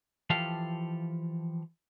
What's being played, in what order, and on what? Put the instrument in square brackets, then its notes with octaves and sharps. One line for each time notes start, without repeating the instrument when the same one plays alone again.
[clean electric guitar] E3 F3 G4 A4 F5